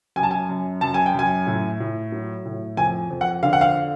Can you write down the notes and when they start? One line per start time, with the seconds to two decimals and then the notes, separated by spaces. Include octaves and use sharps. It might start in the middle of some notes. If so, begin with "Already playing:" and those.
0.16 F#2 G#5
0.23 A5
0.31 G#5
0.49 F#2
0.81 F#2 A5
0.94 G#5
1.06 G5
1.14 F#2 G#5
1.47 A2
1.80 A2
2.12 F#3
2.45 A2
2.77 F2 G#5
3.10 F2
3.21 F#5
3.43 D3 F5
3.53 F#5
3.61 F5